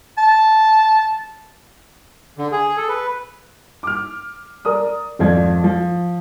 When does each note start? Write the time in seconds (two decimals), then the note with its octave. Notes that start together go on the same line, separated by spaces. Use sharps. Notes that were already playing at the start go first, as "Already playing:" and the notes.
0.18 A5
2.38 D3
2.52 G#4
2.77 A4
2.89 B4
3.83 D6 F6
4.65 A#4 D5 D#6
5.19 G#1 F2 F3 D5 G#6
5.64 F3